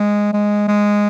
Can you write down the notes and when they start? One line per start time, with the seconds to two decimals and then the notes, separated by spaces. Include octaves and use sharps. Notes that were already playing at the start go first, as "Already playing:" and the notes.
Already playing: G#3
0.33 G#3
0.68 G#3